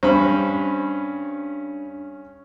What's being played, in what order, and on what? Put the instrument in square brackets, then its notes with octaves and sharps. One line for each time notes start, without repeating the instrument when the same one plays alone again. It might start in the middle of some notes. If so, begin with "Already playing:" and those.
[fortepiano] G2 B5 [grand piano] C#4 [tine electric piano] D4 [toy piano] C5